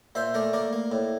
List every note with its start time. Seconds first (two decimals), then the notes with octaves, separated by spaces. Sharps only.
0.15 A#2 C5 E5
0.34 A3 A#4 D5
0.53 A#3 A#4 D5
0.73 A#3
0.92 A2